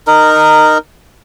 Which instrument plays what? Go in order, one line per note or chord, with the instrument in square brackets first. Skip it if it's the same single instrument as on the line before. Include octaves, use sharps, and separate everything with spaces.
[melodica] D#4 A#4